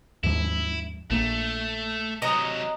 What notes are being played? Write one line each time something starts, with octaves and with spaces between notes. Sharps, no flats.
D#2 G#2 F3 E4
A#1 A3 A#3
C3 F#3 D#5 A#5